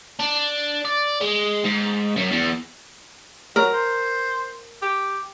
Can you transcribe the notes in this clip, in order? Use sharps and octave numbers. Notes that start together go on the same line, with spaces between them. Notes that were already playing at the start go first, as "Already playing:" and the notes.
D4
D5
G#3
G#2
F#2
E2
F#3 A#4
C5
G4